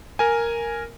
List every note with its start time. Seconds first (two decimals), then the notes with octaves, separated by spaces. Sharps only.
0.19 A#4 G#5